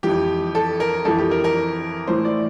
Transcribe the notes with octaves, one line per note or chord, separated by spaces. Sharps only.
F2 E3 G4
A4
A#4
F2 E3 A4
G4
A#4
A#4
A2 E3 C5
D5